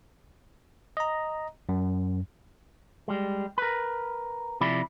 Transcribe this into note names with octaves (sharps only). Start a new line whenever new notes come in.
D#5 A#5
F#2
G3 G#3
A#4 B4
C3 F3 E4 D5 B5